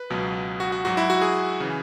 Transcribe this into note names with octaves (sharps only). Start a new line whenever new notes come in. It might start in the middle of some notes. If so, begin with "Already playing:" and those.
Already playing: B4
C#2 B2 F#3
F#4
F#4
G#2 F#3 F#4
E4
F#4
G#4
C#3 E3